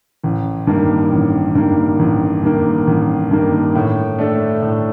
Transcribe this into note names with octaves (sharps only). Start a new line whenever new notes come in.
A1
G2 D#3 A#3
A1
G2 D#3 A#3
A1
G2 D#3 A#3
A1
G2 D#3 A#3
A2
A3 D4 A4
A2